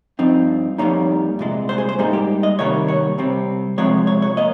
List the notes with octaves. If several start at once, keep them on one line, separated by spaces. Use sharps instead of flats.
G2 F3 C4 D#4
F2 C#3 G3 A#3 D#4 C#5
C2 A#2 G#3
C5
G#4
C5
G#2 G3 A#3 D#4 G#4
G4
D#5
C3 D#3 G3 A#3 C#5
C#5
C2 C3 G3 C4
C3 F3 G#3 C4 C#5
C#5
C#5
A#3 D#5